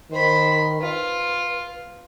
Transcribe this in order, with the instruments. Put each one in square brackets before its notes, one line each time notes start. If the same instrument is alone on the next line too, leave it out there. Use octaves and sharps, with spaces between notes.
[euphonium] D#3 [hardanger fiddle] C5 B5
[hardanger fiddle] F4 [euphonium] B4